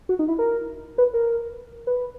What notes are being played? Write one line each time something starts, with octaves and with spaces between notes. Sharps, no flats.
F#4
D#4
E4
A#4
B4
A#4
B4